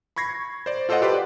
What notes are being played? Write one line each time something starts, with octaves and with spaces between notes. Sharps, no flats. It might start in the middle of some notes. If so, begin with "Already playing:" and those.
B5 C#6 G#6 A#6 C7
C5 D5
F4 A4 C5 D5 D#5 F#5
G4 B4 D5 C6 D6